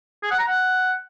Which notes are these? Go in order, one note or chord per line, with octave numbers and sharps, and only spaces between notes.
G#4
F#5
A#5
F#5